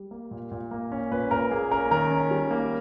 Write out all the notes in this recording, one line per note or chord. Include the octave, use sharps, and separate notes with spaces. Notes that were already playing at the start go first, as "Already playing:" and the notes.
Already playing: G3
A#3
A#2
A#2
A#3
C#4
A#2 B4
A#2 A#4
A#3 G#4
C#4 A#4
D#3 A#4
C#4
G3
A#3